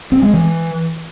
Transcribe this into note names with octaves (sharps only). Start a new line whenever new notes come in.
C4
G#3
E3